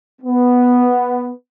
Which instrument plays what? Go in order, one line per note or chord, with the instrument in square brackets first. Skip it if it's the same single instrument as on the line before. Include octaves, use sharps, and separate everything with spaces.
[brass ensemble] B3